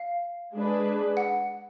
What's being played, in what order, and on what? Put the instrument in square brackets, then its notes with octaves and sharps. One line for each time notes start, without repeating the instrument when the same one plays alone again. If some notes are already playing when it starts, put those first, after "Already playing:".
Already playing: [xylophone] F5
[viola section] G#3 D4 G#4 B4
[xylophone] F#5